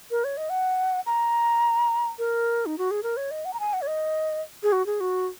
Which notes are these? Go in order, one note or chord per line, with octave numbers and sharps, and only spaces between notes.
A#4
C#5
D#5
F#5
A#5
A#4
D#4
F#4
G#4
A#4
C#5
D#5
F#5
A#5
G#5
F#5
C#5
D#5
G#4
F#4
G#4
F#4